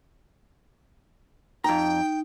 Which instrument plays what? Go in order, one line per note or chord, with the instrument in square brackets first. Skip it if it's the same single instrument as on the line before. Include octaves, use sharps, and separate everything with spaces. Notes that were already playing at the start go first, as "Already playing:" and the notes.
[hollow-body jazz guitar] F2 A#5 [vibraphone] D#4 [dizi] G5